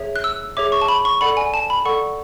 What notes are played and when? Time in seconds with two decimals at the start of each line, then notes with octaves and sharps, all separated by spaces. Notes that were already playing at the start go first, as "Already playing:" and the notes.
Already playing: G#4 C#5 E5
0.16 F#6
0.24 E6
0.57 G#4 C#5 E5 D6
0.72 C#6
0.82 A5
0.88 B5
1.05 C#6
1.21 A4 D5 F#5 B5
1.37 G#5
1.54 A5
1.70 B5
1.85 A4 D5 F#5 C#6